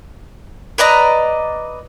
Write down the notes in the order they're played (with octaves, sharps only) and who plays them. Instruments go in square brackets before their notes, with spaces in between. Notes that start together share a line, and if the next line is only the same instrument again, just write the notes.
[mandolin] B4 D5 D#5 A#5